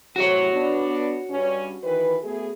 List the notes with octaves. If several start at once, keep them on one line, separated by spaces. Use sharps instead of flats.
A2 C3 F#4 C#5
B3 D4
G2 C#4
D#3 E3 B4
A3 B3 G#4